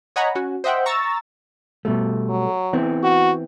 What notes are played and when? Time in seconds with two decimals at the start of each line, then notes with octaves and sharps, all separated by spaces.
0.16 C#5 D#5 F#5 G#5 A#5 B5
0.35 C#4 F#4
0.64 C5 D#5 E5 F#5 G5
0.86 A#5 C#6 E6 A6
1.85 B2 G3 A3
2.29 F#3
2.73 E3 B3 C4
3.03 F#4